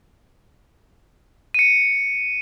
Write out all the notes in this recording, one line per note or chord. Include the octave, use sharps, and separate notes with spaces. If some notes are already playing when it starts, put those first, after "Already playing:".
C#7 D#7